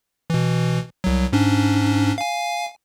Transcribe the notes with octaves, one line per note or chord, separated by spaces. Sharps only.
B2 E3
C2 F#3
G#2 C#4 D4
F5 G#5